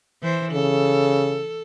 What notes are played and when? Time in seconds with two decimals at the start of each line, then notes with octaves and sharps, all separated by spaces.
0.23 E3 C5
0.52 C#3 A4